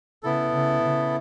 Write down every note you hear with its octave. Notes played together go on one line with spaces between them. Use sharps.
C#3 B3 E4 A4
C#3
C#3